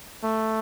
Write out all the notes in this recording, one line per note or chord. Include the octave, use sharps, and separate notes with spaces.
A3